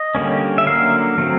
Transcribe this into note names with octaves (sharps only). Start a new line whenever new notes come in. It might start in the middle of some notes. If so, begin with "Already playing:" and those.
Already playing: D#5
D3 G3 A#3 C#4
E5
D3 F#3 A#3 F5
F#3 A3 C4